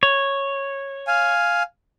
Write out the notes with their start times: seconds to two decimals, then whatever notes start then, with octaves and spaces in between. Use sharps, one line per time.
0.03 C#5
1.07 F5 G#5